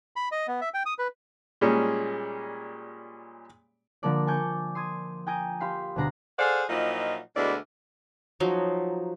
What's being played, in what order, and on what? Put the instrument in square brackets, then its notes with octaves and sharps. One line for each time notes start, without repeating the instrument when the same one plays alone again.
[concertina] B5
D#5
B3
E5
G5
D#6
B4
[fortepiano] A#2 G3 G#3 C#4
[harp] D3 F3 A#3 A4 D5
G#5 A5 C#6 D6 G6
C6 D#6 G#6
G5 G#5 A#5 D#6 G6 D7
G4 F5 B5 C6
D2 B2 D4 A#5 C7
[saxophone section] G#4 A4 C5 D5 F5 F#5
A#2 F3 F#3 D#4 E4 D#5
D2 B2 D3 G#3 E4 D5
[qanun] F3 F#3 D#4